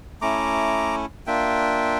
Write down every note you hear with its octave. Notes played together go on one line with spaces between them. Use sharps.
A3 C#4 E4 A#5 D6
A#3 D4 F4 E5 G5